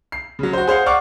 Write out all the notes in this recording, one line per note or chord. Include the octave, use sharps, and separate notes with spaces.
C7
C#3 F#3
F#4 C5
G#4 C5 F5 F#5
D5 F5 F#5 C#6 D6